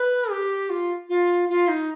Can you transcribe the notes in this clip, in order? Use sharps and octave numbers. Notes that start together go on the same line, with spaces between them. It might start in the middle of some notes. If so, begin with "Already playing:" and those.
Already playing: B4
G4
F4
F4
F4
D#4